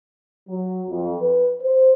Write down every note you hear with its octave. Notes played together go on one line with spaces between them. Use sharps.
F#3
F2
B4
C5